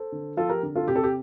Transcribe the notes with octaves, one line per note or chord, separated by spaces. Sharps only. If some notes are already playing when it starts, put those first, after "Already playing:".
Already playing: A4 C5
D3
F3 F4 A4
G4 A#4
D3
F4 A4
C3 G4
A4
G4